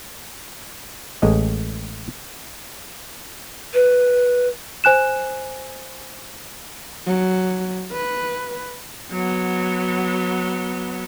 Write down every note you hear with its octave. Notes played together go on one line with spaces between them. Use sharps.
A1 G#3 D#5
B4
C5 G#5 F#6 E7
F#3
B4
F#3 B3